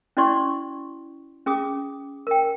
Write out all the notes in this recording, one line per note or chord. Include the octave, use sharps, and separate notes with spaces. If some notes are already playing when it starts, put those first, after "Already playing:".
C#4 E4 F#4 D5 C6 C#6
C#4 G#4 D6 D#6
A#4 G5